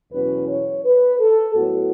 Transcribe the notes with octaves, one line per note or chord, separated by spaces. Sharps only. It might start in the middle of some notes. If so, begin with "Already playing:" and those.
E2 B2 F#3 C#4 B4
C#5
B4
A4
A2 F#3 B3 F#4